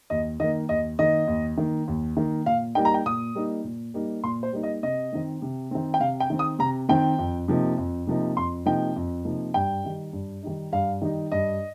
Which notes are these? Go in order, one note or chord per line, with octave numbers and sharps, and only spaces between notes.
D#2 D#5
D#3 A#3 D#5
D#2 D#5
D#3 A#3 D#5
D#2
D#3 A#3
D#2
D#3 A#3
A#2 F5
G3 A#3 D#4 G5
A#5
G5
A#2 D#6
G3 A#3 D#4
A#2
G3 A#3 D#4
A#2 C6
C5
G3 A#3 D#4
D#5
C3 D#5
D#3 C4
C3
D#3 C4
G5
C3 F5
G5
D#3 C4
D#6
C3 A#5
D#3 C4 G5
F2
C3 F3 A#3 D#4
F2
C3 F3 A#3 D#4
F2 C6
C3 F3 A#3 D#4 G5
F2
C3 F3 A#3 D#4
G2 G5
D#3 G3 D#4
G2
D#3 G3 D#4
G2 F5
D#3 G3 D#4
G2 D#5